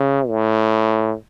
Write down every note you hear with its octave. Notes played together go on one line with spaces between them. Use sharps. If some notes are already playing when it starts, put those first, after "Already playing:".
Already playing: C#3
A2